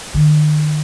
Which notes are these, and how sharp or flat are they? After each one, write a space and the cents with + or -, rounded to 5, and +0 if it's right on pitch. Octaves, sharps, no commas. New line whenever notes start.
D#3 -45